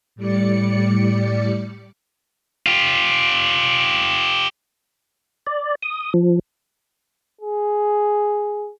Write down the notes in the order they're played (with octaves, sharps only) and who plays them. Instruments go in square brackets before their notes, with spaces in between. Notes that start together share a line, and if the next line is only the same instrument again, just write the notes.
[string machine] A2 G3 D5 C#7
[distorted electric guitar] F4 G4
[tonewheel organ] D5
D#6
F3
[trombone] G#4